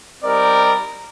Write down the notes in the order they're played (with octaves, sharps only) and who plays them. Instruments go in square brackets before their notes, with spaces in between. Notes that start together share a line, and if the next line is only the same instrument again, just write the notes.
[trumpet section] G3 C4 D#4 A#4 D5